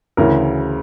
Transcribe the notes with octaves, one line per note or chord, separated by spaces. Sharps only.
D2 C#3 E3 A#4